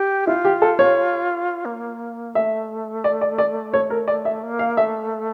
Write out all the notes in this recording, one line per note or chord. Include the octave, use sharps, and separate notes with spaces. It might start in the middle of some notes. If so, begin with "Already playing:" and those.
Already playing: G4
E4 F4
G4
A4
C#5
A#3
A3 E5
D5
D5
D5
C#5
A#4
D5
E5
A#3
F5
A3 E5